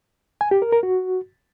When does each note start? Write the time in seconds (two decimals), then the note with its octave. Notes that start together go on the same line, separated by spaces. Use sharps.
0.41 G#5
0.51 G4
0.62 A#4
0.72 A#4
0.83 F#4